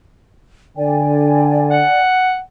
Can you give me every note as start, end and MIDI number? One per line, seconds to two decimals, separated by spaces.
0.77 1.83 50
0.77 2.02 74
0.77 2.02 79
0.77 2.02 80
1.71 2.38 78